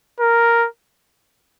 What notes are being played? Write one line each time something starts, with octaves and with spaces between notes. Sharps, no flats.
A#4